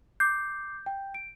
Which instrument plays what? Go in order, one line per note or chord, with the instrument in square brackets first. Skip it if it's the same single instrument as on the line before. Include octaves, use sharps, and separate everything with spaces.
[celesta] D6 C7 [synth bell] G6
[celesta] G5
D7